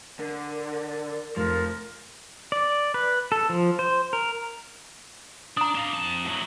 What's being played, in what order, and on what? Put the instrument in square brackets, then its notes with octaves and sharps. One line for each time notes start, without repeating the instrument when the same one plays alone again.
[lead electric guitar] D3 [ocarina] A#4
[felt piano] F1 [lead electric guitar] F3 [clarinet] A#4 [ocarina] C6
[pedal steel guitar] D5
B4
A4
F3
C5
A#4
[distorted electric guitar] D4 [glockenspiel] A#5 D#6
[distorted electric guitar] D4 F5
F2 A5
A2 F#3